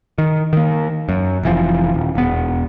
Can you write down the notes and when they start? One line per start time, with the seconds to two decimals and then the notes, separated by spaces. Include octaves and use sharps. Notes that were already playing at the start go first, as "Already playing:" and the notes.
0.18 D#3
0.53 D#3 A#3
1.09 F#2
1.43 F1 E3 F3
1.94 D#1
2.15 E1 B3